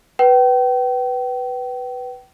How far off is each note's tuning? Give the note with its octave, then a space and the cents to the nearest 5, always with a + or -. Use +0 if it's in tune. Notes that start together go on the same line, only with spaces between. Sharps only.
B4 +0 G5 -35